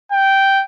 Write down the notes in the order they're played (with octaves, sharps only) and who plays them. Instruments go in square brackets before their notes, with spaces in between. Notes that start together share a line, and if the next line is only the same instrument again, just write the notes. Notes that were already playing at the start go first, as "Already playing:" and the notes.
[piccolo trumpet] G5